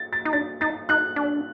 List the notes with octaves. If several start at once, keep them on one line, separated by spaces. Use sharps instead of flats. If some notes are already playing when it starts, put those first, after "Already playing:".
Already playing: A6
A6
D#4
D4 A6
D#4 A6
D#4 F#6
D4